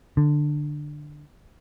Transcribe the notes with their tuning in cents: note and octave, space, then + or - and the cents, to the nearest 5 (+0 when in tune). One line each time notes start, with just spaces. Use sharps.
D3 +15